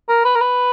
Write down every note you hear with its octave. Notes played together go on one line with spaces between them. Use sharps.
A#4
B4
A#4
B4